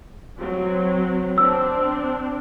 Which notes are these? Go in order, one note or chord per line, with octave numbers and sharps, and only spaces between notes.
F#3 C4
C4 D4 E6